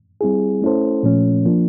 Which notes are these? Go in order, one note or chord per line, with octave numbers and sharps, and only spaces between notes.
G3 C4 E4 G#4
A3 C#4 E4 A4 C5
A#2 F3 A3 C#4
F3 A#3 D4